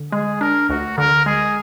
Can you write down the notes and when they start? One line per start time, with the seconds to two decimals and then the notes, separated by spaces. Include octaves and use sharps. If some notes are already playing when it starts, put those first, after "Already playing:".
Already playing: D3
0.12 G#3 G#4
0.41 D4 A#4
0.69 D2 F#4
0.98 D3 A#4
1.26 G#3 G#4